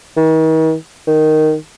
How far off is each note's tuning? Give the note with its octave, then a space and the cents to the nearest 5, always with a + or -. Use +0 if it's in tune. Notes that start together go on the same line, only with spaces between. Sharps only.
D#3 +45
D#3 -5